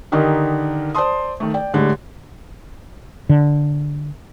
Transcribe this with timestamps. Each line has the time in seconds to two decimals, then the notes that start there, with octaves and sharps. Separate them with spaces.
0.12 D3 D#3 D#4 G4 A#4
0.95 C5 D5 A5 C6 D#6
1.40 D#3 A3
1.54 D5 G5
1.74 A2 D3 G3 G#3
3.29 D3